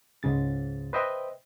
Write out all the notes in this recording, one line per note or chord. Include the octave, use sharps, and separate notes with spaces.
C#2 G#2 C#3 A6
B4 C5 D#5 E5 G5